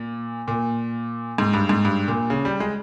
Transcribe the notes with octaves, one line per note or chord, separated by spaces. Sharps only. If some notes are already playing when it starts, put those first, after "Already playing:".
Already playing: A#2
A#2
G#2
G2
G#2
G2
A#2
C#3
G3
G#3